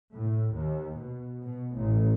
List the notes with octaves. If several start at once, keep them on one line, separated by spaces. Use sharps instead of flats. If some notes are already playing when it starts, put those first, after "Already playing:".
A2
D#2
B2
B2
A1